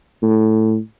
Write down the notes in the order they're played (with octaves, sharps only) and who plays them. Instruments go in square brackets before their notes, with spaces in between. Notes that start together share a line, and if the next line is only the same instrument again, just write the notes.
[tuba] A2